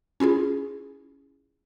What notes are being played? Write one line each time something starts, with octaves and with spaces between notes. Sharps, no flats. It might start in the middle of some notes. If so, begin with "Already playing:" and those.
C#4 E4 F4 G#4